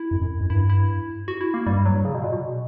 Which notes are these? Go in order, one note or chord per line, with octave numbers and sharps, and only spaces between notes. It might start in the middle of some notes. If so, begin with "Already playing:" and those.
Already playing: E4
F#2
F#2
F#2
G2 E4
E4
F#4
E4
A#3
G2 G3
F#3
C#3
B2
A#2
B2